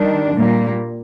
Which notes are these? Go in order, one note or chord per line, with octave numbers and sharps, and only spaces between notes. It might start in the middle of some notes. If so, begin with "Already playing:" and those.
Already playing: D#3 G3 D4
A#2 G3 A#3